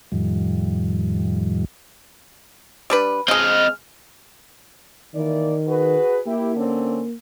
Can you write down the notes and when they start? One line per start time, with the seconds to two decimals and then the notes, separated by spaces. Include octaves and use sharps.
0.12 F2 A2 D#3 F3 G3
2.90 G3 D4 B4
3.28 C#3 G#3 C4 D#5 F6
5.15 D#3 E3 A#3 D5
5.67 F#4 G#4 B4
6.26 A#3 E4 G4
6.56 D3 C4 C#4